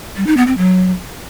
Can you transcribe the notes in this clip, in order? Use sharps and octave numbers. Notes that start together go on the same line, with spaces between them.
G3
D#4
B3
C4
F#3